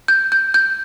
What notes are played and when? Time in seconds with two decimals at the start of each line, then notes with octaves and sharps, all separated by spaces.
0.08 G6
0.32 G6
0.54 G6